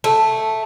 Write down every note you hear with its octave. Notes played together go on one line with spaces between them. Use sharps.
A3